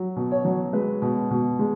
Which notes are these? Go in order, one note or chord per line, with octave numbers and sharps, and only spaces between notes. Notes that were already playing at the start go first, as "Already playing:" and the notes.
Already playing: F#3
B2
C#5
F#3
G#3 B4
B2
B2
G#3